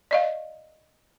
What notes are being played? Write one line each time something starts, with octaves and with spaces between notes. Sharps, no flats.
D5 D#5 F5